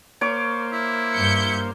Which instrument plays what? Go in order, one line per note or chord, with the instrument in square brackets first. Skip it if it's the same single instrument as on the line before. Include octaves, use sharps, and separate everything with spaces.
[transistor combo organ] A#3 C5 [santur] C#5 D6
[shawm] E4
[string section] G2 G6 C#7